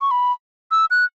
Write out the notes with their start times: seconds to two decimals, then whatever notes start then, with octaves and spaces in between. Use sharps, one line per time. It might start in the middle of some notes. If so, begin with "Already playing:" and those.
0.01 C#6
0.11 B5
0.71 E6
0.91 F#6